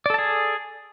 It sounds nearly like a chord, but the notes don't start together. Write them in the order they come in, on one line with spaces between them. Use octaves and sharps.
D5 A4 A5 G#4